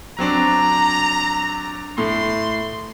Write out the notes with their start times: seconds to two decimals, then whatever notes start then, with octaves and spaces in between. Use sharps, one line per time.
0.19 F#3 C4 D4 A#5
1.98 A2 C6